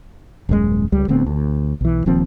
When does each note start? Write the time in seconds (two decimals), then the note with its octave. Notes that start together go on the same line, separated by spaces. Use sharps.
0.49 D#1 F#2 C3 G#3
0.92 C#2 G3
1.08 D1 D2 B3 C4
1.26 D2
1.81 B1 E3
2.06 D#1 D#2 F3 C4